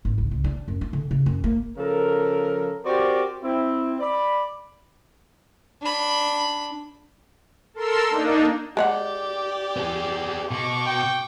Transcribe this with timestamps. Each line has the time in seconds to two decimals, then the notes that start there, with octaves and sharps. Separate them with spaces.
0.05 G#1
0.18 C#2
0.31 C#2
0.44 D4
0.68 F#2
0.81 D4
0.93 D3
1.11 C#3
1.26 F#2
1.44 A#3
1.77 C#3 F3 A4 A#4
2.86 C4 F#4 G4 A#4 C5 D5
3.43 C4 E4
4.00 D5 B5
5.81 D4 B5
7.74 A4 A#4 C6 E6
8.09 A#3 D4 D#4
8.77 G#3 G4 C#5 D5 F#5
9.76 B3 G#4
10.51 B2 C#6 D6
10.87 G5